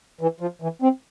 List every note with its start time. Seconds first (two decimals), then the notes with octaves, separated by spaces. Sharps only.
0.21 E3
0.41 F3
0.62 E3
0.82 C4